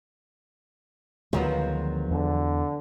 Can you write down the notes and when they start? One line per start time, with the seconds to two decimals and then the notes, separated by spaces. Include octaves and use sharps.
1.33 D2 D#3 F3 F#3 G#3 B3
2.11 E2 D3